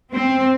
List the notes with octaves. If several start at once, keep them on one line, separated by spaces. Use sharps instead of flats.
C4